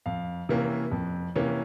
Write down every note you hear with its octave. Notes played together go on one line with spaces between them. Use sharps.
F2 F5
C3 E3 A#3 C#4
F2
C3 E3 A#3 C#4